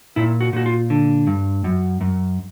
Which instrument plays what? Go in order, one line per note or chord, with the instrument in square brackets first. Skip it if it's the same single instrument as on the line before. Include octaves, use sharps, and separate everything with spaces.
[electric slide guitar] A#2 E4
F#4
A#2 F#4
F4
D3
G2
F#2
F#2